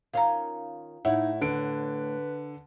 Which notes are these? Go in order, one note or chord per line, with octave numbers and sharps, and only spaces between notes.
D#3 C#4 F4 F5 A#5
A2 D#4 E4 C#5 F#5
D3 B4 D7